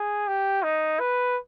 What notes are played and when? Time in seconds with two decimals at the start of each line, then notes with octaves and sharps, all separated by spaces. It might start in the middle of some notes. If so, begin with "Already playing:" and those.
Already playing: G#4
0.28 G4
0.63 D#4
1.00 B4